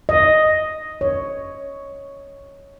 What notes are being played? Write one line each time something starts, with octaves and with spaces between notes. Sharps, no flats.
D#5
C#5